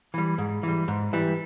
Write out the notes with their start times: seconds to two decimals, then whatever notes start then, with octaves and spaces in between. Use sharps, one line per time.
0.14 E3 G3
0.38 G#2
0.63 E3 G3
0.88 G#2
1.13 E3 G3